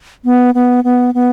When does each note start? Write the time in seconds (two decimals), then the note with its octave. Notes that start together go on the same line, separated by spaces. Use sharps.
0.25 B3
0.55 B3
0.84 B3
1.14 B3